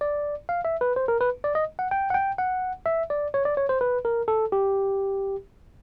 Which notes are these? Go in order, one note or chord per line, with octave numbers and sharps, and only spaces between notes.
D5
F5
E5
B4
C5
A#4
B4
D5
D#5
F#5
G5
F#5
G5
F#5
E5
D5
C#5
D5
C#5
C5
B4
A#4
A4
G4